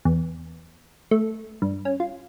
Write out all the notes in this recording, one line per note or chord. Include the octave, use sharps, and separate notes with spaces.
E2
A3
G2
C#4
F4